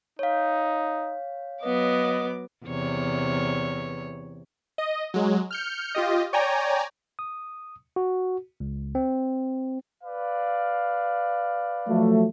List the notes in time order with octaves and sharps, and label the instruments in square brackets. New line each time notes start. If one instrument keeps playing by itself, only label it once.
[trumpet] D#4 [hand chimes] C#5 F5
[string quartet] F#3 B3 D6 [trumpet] D#5
[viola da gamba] E2 C3 C#5
[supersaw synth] D#5
F#3 G#3
F6 G6 C#7
F4 G4 D#5
C#5 D5 G5 G#5 A#5
[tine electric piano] D#6
F#4
C#2
C4
[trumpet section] B4 D5 F5
[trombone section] F3 F#3 A3